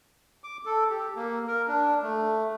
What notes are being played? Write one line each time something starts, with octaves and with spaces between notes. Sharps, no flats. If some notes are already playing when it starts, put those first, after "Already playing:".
D6
A4
G4
A#3
A#4
D4
A3